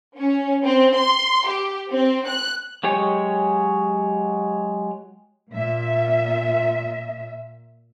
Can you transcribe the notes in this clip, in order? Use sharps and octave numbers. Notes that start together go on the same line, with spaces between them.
C#4
C4
C6
G4
C4
F#6
F#3 G#3 G4 C#5 G#5
A#2 E5